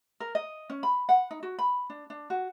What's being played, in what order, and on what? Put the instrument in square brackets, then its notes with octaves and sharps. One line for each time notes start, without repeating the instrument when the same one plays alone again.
[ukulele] A#4
D#5
C#4
B5
F#5
D#4
F#4
B5
D4
D4
F#4